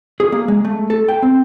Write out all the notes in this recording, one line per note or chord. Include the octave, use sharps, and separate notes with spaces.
G#4
A#3
G#3
A3
A4
G5
C4